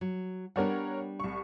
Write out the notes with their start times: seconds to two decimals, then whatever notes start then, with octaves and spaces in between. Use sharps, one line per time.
0.01 F#3
0.56 G3 B3 D4 A#4 C#5 F#5
1.20 C2 C#6